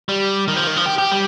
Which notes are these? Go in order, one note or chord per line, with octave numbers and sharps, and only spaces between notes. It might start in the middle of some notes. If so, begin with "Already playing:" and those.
G3
D#3
F3
D#3
F3
G4
G4
G3